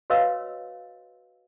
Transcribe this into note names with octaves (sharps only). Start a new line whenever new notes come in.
F#4 B4 C#5 D#5 F5 E6